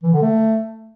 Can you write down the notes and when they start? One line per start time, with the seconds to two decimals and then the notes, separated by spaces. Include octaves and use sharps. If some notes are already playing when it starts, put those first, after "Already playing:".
0.03 E3
0.12 D3
0.22 A3